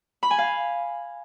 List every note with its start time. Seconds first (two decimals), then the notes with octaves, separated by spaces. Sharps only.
0.23 B5
0.31 G#5
0.38 F5